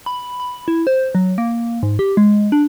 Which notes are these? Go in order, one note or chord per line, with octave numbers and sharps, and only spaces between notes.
B5
B5
E4
C5
F#3
A#3
G#2
G4
G#3
D4